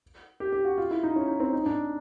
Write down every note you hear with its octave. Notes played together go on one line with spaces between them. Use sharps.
G4
G4
F#4
F4
E4
D#4
C#4
D#4
C4
D#4
D4